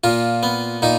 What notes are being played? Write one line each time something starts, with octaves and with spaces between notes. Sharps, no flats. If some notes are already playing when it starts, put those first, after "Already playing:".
A#2 F4
B3
A#2 D#4